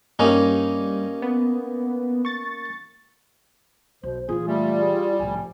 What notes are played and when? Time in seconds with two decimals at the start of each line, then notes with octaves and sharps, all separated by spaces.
0.19 G2 G3 A#3 C#4 D#4
1.22 B3
2.25 C#6 A6
4.03 B1 B2 C5
4.29 A#2 E3 F4 G#4
4.47 G3 A3
4.80 G#4
5.19 C2 A2 F3 G#5